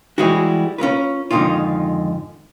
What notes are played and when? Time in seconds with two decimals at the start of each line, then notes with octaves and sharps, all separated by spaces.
0.18 E3 G3 G#3 E4 F#4
0.78 C#4 F4 A#4 B4
1.31 F2 G#2 D3 D#3 D#4 F4